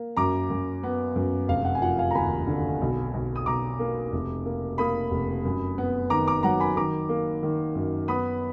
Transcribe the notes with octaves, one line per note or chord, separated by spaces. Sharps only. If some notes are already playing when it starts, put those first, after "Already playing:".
Already playing: A#3
F#2 A#5 D6
F#2
B3
F#2
F1 F5
F#5
G#5
F3 F#5
F5 G#5
A#5
D#2 G#5 B5
D3
B1
B1
D#6
B1 A#5 D6
A#3
F1
A#3
A#3 B5 D#6
F1
F#2
B3
D#3 A#5 D6
A#5 D6
F#3 F#5 A#5
G#5 B5
D#3 A#5 D6
A#3
D#3
F#2
B3 B5 D#6